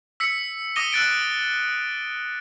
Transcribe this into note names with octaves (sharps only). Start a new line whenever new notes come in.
E6 B6 C#7
D6 D#6 A#6 D#7 G7
E6 F#6 A6 D7